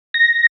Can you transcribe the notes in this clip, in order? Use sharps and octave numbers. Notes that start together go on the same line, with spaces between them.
A#6